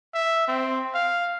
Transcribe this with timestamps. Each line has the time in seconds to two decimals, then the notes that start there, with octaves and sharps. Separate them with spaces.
0.14 E5
0.48 C4
0.95 F5